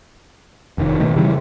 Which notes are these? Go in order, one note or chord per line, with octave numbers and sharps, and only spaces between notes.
F1 D#3
B2 D#3 A3
C#3 E3 G3